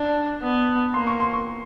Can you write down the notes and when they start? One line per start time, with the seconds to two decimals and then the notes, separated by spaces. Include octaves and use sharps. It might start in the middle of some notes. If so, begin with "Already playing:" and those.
Already playing: D4 A5
0.42 B3
0.94 A#3 C6
1.07 C#6
1.20 C6
1.33 C#6